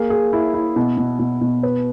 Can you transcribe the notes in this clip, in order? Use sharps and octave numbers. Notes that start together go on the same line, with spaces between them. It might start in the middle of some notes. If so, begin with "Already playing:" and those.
Already playing: A#3 G#4
G#4
E4
E4
B2
B2
B2
B2
B4